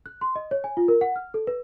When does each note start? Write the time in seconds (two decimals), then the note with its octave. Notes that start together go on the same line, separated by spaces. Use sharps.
0.06 F#6
0.21 C6
0.36 D#5
0.51 C#5
0.64 G#5
0.77 F4
0.88 A#4
1.01 F#5
1.16 F6
1.34 A4
1.47 B4